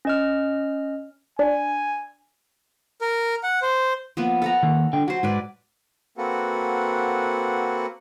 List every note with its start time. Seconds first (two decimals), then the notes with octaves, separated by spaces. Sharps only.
0.05 C#4 D#5 F6
1.39 D4 G#5
3.01 A#4
3.43 F#5
3.62 C5
4.17 F3 A#3 B3
4.42 A4 F#5 A#5
4.63 D#3 A#3
4.93 D3 G5
5.08 F#3 F#4 C5
5.23 G#2 F#3 B4 D5
6.18 A#3 C4 F#4 A4 B4 F#5